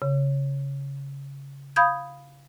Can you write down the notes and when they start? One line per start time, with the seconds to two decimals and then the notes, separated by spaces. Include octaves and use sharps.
0.02 C#3
1.76 F5 B5 D#6 G6 G#6